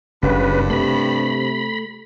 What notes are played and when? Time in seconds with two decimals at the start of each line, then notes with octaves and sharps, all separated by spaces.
0.23 F#1 G2 C#3 B4
0.70 C3 A3 B5